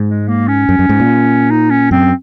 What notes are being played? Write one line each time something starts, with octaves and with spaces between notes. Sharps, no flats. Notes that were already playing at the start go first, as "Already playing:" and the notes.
Already playing: G#2
G#3
A#3
C#4
F#2
F#2
G#2
A#2
D#4
C#4
F#2 C4